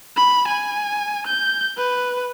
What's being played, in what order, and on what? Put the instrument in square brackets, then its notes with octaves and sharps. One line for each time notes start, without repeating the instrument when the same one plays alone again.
[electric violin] B5
G#5
G6
B4